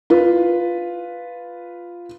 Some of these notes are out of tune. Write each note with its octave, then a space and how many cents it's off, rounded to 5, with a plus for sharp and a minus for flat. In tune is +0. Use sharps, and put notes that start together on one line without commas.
F4 +0 B4 +0